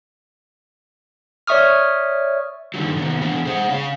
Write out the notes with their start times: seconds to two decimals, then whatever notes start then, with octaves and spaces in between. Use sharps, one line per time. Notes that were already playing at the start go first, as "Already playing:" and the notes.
1.47 C#5 D5 E5 C#6 D#6 F6
2.74 G2 D3 D#3 F#3
2.96 C3 D#3 B3
3.21 B2 E3 B3 D4 G#4
3.45 G#4 C5 F#5
3.69 C#3 C#4 F5